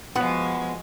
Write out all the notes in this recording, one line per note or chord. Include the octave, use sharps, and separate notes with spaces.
F3 G#3 B3 F#4